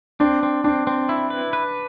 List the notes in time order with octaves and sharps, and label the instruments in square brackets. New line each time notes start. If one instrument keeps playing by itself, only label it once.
[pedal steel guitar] C4 [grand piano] D4
[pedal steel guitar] C4
[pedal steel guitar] C4 [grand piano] D4
[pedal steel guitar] C4
E4
B4
B4